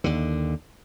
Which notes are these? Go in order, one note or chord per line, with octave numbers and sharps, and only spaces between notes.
D#2 D3